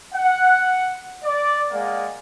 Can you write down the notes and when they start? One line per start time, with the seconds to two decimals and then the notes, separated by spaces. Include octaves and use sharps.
0.13 F#5
1.22 D5
1.71 G#3 A#3 D5 F#5